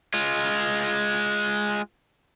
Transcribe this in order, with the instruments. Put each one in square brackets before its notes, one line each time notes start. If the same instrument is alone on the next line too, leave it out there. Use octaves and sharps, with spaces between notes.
[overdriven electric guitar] G#3 F4